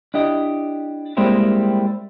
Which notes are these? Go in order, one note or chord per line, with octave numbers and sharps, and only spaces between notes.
D4 E4 G4 D#5
G3 G#3 A#3 C4 E4 G4